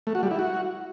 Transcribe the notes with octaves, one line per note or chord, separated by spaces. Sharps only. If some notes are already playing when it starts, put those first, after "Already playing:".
A3
F#4
G3
E4
F#4